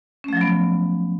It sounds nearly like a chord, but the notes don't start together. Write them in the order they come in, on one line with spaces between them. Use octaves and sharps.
C#4 A3 F3 F#3 B3